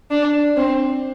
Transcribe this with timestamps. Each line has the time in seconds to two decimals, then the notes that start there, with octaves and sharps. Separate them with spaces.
0.11 D4
0.56 C4